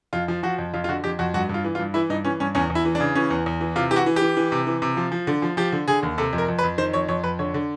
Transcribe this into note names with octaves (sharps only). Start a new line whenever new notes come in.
F2 F4
F3
F3 F#4
F2
F2 F4
F4
D3 F#4
F2 G4
F2 F#4
G2 F#4
G2
F4
E3
F4
G2
E3 E4
G2 D#4
E3 C#4
G2 C#4
E2 C#4
E2
E4
E3
D4
C#3
E3 C#4
E2
E2
E3
C3 F4
E3 G4
F#4
E3
G4
E3
E3
C3
E3
C3
F3
F3
D3
F3
F3 G4
D3
D3 G#4
D#2
C3 A4
F2
A#4
F2
B4
F2
D#3 C5
F2 C#5
F2 C#5
F2 B4
D3 C#5
D3